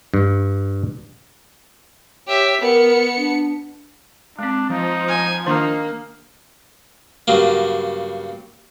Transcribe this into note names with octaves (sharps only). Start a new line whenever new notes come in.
G2
G4 C#5 E5
B3 A#4 C#7
D4
G#3 C4 D4
F3 D#4
G#5
D#3 A#3 D4 D#4
G2 C#3 F#3 A#3